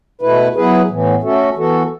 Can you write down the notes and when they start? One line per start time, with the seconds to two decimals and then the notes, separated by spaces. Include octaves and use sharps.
0.21 B2 A3 E4 B4
0.55 F#3 B3 E4 G#4 B4
0.89 A2 E3 B3
1.23 A3 C#4 F#4 A4
1.57 E3 B3 F#4 A4